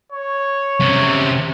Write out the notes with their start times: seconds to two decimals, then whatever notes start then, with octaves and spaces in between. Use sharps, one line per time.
0.12 C#5
0.81 C3 C#4